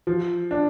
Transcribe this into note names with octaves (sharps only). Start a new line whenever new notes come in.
F3
D4